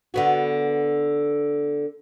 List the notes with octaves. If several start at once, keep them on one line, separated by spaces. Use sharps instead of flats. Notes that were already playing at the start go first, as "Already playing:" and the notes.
D3 B3 F#4